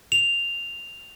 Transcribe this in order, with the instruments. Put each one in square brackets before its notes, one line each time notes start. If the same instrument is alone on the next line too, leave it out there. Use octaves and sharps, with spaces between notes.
[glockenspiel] F7